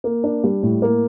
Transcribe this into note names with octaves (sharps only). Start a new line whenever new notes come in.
A#3
D4
G3
A2
A#3